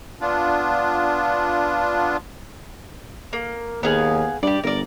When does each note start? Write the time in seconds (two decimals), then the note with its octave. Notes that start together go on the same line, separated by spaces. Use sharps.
0.21 B3 D4 F4
3.33 A#3
3.83 D#2 B3 G#4 F5
4.43 G2 G4 D5
4.64 G1 A#4 D5